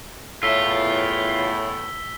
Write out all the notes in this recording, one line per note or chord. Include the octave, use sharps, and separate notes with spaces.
E2 A2 F4 C#5 E5 E6 B6 G7